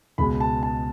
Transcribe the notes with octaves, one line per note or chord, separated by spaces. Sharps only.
C#2 B2 G#3 B5
A5
A5